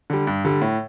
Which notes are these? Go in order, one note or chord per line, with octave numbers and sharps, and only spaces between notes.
D3 G3
G2
D3 G3
A2